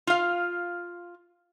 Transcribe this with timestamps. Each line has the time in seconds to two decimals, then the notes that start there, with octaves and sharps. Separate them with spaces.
0.07 F4 F5